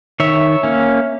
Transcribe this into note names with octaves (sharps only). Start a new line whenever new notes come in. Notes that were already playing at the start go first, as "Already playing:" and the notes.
D#3 C#5 E5
A#3 C#4